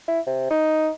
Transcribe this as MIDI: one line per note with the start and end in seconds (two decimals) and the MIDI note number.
0.08 0.20 64
0.27 0.48 48
0.51 0.90 63